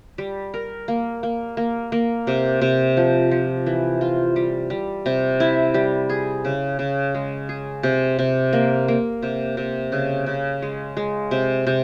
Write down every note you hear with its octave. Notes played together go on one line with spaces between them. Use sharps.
G3
A#4
A#3
A#3
A#3
A#3
C3
C3
F3
F3
E3
F4
G3
G3
C3
E4
G3
G#4
C#3
C#3
G#3
G#4
C3
C3
A#3
A#3
C3
C3
C#3
C#3
G#3
G#3
C3
C3